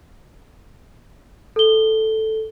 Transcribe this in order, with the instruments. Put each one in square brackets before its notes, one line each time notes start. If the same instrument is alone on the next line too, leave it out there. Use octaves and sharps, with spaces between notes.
[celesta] A4 G7